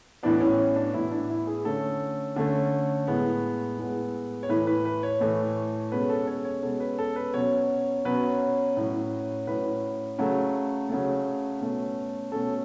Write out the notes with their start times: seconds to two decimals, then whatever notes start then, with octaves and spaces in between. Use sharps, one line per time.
0.23 A2 E3 B3 D4
0.40 C#4
0.58 C#4
0.76 D4
0.94 A2 E3 B3 E4
1.11 D4
1.30 E4
1.47 G#4
1.65 D3 A3 C#4 A4
2.36 D3 A3 C#4
3.07 A2 G#3 B3
3.78 A2 G#3 B3
4.43 C#5
4.49 A2 E3 A3 B4
4.67 B4
4.85 B4
5.03 C#5
5.21 A2 E3 A3
5.92 B2 G#3 C#4 B4
6.10 A4
6.27 C#5
6.45 C#5
6.63 B2 G#3 C#4 A4
6.80 B4
6.99 A4
7.16 B4
7.34 B2 F#3 C#4 C#5
8.05 B2 F#3 C#4 B4
8.77 A2 F#3 C#4
9.47 A2 F#3 C#4 B4
10.18 C#3 F#3 A3
10.90 C#3 F#3 A3
11.61 B2 A3 C#4
12.32 B2 A3 C#4 A4